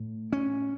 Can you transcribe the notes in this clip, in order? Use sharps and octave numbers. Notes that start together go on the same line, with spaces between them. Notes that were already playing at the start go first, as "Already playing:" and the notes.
Already playing: A2
C#4